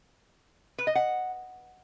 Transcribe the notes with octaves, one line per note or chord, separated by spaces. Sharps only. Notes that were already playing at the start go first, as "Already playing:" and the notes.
B4
D#5
F#5